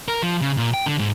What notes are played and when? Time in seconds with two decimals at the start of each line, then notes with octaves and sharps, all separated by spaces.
0.08 A#4
0.23 F3
0.41 C#3
0.57 A#2
0.74 G5
0.86 D3
0.99 G#2